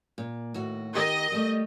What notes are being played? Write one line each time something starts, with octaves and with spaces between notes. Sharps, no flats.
A#2
D#2 A2 F#4
D#3 G4 D#5
G3 A3